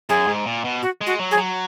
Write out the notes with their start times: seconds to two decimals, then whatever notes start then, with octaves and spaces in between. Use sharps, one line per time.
0.09 F#2 G#4
0.27 G#2
0.46 A#2
0.64 B2
0.82 F#4
1.01 G#3
1.06 F#4
1.19 F#3
1.31 G#4
1.38 F#3